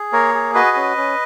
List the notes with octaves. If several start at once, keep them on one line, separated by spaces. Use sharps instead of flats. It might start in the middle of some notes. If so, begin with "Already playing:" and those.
Already playing: G#4
A#3 A#4 C#5
G#4
F#4 B4 D#5
C#4
C#4